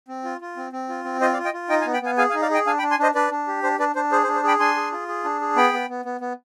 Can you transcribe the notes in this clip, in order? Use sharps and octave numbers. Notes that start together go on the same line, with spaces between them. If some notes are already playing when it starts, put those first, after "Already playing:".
C4
F4
F4
C4
C4
F4
C4
F4 C5 D#5
D5 F5
F4
D#5 G5
F4
D#4 D#5 G5
F5 G#5
B3
G5 B5
B3 F5 G#5
G#4 F5 G#5
F5 G#5
D#4
D5 F5
G#4 D#5 G5
D4 F5 G#5
G5 B5
D4
G#5 C6
D4 C5 D#5
D4 B4 D5
D4
G4
D4 C5
D4 B4 D5
D4 C5
G#4 C5
C5
D4
C5
G#4 G5 B5
D4 G#5 C6
G#4
F4
G#4
D4
G#4
B3 G5 B5
B3
B3
B3
B3